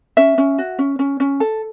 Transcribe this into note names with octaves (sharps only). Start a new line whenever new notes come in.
C#4 E5
C#4
F#4
C#4
C#4
C#4
A4